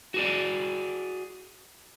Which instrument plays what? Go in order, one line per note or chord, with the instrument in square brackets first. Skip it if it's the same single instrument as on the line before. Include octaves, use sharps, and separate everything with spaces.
[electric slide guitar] F#4 G#4 D5